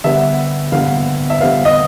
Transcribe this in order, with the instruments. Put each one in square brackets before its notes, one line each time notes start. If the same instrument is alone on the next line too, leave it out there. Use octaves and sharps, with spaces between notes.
[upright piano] D3 G3 B3 E5
D3 G3 B3 F5
E5
D3 G3 B3 F5
D#5